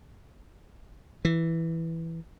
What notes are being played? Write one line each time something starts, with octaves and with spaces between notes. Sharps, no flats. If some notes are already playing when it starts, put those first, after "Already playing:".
E3